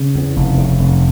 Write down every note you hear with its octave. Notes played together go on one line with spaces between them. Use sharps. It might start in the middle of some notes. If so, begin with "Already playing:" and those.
Already playing: C#3
E2
F1
C#3
F1